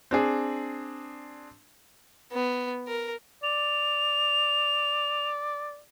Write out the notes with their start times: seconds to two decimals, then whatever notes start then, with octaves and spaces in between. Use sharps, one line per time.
0.11 C4 D4 G#4
2.32 B3
2.87 A#4
3.43 D5 F7